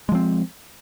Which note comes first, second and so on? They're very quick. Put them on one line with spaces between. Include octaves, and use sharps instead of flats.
G#3 F3 C4